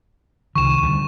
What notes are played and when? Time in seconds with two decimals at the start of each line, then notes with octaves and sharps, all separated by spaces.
0.55 C2 D#3 C#6 E7
0.82 D2 D3 G3